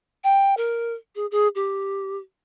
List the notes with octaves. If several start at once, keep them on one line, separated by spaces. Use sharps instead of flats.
G5
A#4
G#4
G#4
G4